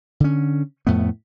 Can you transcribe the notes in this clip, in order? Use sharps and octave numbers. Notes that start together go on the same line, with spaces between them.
D3 C#4
F2 A2 A3 B3